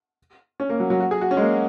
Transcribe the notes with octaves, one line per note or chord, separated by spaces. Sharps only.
C#4
A#3
F#3
F#3
F#4
G#4
F#4
C#4
G#3
A#3